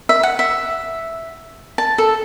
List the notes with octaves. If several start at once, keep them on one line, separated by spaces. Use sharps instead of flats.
E5
F#5
E5
A5
A4